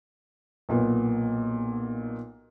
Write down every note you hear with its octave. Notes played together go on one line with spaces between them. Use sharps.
B1 A#2 B3